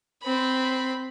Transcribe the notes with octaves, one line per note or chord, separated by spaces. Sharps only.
C4 B5